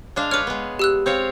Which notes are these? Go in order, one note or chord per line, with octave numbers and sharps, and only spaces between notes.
G#3 D4 F5
B4 C#5 D6 F6
G#3 B3
G4 E6 F#6
C4 C#5 F5